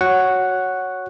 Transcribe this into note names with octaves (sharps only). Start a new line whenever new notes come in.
F#4 C#5 F#5